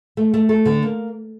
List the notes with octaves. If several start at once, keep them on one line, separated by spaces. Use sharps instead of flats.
A3
A3
A4
D3
A#3